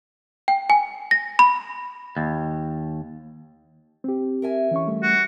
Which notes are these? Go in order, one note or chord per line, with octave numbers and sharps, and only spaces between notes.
G5
G#5
A#6
B5
D#2
C4 G4
A#4 E5 G#5
E3 C#4 C#6
G3 A3
F#4